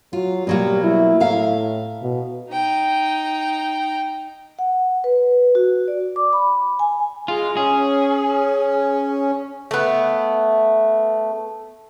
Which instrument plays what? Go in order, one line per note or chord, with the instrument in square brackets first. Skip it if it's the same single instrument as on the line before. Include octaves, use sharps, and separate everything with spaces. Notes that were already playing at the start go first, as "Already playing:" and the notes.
[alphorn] F#3 [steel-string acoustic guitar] F4
[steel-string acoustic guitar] B2 F#3 A#3 [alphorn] G3
[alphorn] E4
[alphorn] A2 [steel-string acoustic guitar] E5 F5 A#5
[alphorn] B2
[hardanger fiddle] D#4 G5
[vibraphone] F#5
B4
F#4
D5
D6
B5
G#5
[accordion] G#3 [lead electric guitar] F4
[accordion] C#4 [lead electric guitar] G#4
[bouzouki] A3 B3